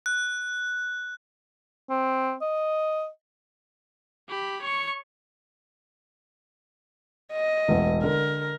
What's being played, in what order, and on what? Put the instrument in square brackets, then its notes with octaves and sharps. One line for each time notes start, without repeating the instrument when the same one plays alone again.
[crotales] F#6
[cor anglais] C4
D#5
[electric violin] G4 B5
C#5 C#6
[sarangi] D#5
[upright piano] E1 A1
[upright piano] D3 [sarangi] A#4